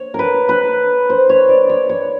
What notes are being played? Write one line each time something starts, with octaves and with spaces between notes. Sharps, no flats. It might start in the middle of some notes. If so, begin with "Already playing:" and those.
Already playing: C#5
A#4 B4
B4
C5
C#5
D5
C#5
C#5